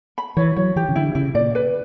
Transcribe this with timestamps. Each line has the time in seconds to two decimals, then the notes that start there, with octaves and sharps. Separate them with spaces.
0.18 B5
0.37 E3 C#5
0.56 F#3 C#5
0.76 E3 G4
0.89 C#3
0.96 D3 E4
1.15 C#3 E4
1.34 A#2 D5
1.55 B4